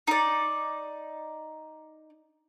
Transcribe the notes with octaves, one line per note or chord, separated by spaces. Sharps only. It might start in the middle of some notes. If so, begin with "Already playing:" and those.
D#4 D5